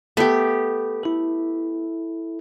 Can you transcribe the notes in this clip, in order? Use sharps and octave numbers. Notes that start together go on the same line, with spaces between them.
A3 B3 G4
E4 A4